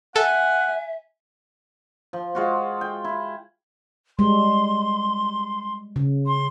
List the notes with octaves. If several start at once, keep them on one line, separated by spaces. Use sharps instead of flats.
A4 E5 F#5 G#5
F3
G#3 F4 F#4
G5
E4
G3 G#3 C6
C#3
C6